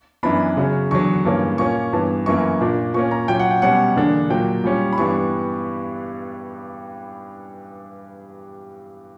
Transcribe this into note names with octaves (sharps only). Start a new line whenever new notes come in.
F#2 E3 B3 D4 B5
C#3 F#3 C#4
E2 D3 F#3 C#6
G2 E3 A#3 C#4
A#2 A#3 C#4 C#6
G2 E3 B3
F#2 E3 A#3 C#6
A#2 A#3 D4
A#2 A#3 C#4 C#6
A#5
A#2 F#3 C#4 G5
F#5
G5
B2 G3 C#4 F#5
E2 D3 A#3 D4
A#2 F#3 A#3 G5
A#2 G3 C#4
B5
G2 E3 G3 B3 D4 C#6